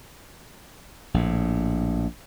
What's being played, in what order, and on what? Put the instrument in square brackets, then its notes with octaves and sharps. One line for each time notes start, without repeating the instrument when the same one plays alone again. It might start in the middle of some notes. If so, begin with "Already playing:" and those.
[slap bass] A#1 A2